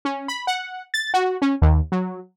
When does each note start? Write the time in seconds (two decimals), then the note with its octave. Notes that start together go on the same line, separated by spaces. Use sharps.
0.05 C#4
0.28 B5
0.47 F#5
0.94 A6
1.14 F#4
1.42 C#4
1.62 D#2
1.92 F#3